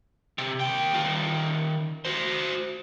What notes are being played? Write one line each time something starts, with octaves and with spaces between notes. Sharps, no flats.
C3
D#2 G5
D#3 F4
F#4 C5